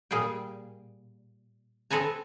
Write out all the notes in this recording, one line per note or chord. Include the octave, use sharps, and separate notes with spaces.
A#2 G3 G#4 F5 G5
C4 A4 B4 G#5 A#5